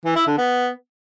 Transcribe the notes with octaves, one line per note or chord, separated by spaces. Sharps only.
E3
E4
D3
B3